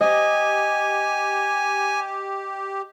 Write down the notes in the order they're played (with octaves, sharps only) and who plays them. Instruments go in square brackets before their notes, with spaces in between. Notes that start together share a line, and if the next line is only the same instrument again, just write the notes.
[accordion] G4 [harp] D#5 [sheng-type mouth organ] G#5